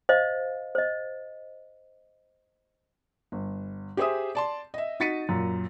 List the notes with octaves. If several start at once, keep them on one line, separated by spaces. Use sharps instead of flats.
C5 D#5 F5
C5 D#5
G1
G4 G#4 C5 E5 D#6
D5 A5 C6
D#5 E5
D#4 F#4 A6 B6 C#7 D#7
F#2 A#2